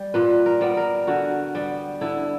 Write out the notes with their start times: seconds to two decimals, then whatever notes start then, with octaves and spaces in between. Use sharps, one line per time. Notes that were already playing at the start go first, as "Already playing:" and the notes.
Already playing: G3
0.14 A#2 B4
0.46 A#4
0.61 G3 B3
0.77 A#4
1.07 D3 F#4
1.55 G3 B3
2.01 D3 E4